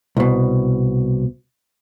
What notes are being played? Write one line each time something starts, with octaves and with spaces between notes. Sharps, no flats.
C2 B2